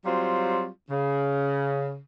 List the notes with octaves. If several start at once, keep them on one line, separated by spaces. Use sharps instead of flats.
F#3 G3 C4 F4
C#3